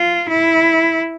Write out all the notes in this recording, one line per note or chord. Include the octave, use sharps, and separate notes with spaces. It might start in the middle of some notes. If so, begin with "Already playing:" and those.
Already playing: F4
E4